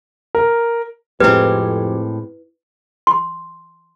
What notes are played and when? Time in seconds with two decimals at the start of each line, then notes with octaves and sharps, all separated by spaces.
0.35 A#4
1.20 F2 A2 G#3 C4 E4 G4 B4
3.07 C6